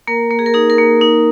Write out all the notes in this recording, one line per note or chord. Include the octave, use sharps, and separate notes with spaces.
A#3 A#4
A#3
G#4
A#4
D#4 G#4
A#4
A#3
D#4